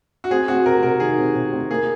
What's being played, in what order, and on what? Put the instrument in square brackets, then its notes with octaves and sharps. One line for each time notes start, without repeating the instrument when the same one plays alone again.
[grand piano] F#4
[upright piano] C4 [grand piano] G#4
[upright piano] C4 [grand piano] F#4
[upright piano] C3 [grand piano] A#4
[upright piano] C3 [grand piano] A#4
[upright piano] D#3 [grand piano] G#4
[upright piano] C3
C3
C4
[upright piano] A#3 [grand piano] G#4